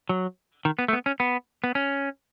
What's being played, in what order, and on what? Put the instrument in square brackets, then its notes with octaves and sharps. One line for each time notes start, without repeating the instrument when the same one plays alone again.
[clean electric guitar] F#3
D#3
B3
A3
B3
C#4
B3
B3
C#4